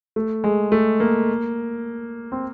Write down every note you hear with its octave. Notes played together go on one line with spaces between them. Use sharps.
A3
G#3
A3
A#3
C4